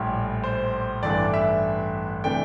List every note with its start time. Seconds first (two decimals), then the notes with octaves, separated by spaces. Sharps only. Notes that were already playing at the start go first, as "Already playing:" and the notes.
Already playing: A#1 A2 G3
0.44 C5
1.03 A1 G2 E3 A3 D4 D5
1.34 E5
2.24 C3 E3 A3 D4 G5